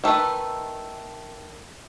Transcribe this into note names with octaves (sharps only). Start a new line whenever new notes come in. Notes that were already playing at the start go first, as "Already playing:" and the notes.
D#3 A3 D#4 B4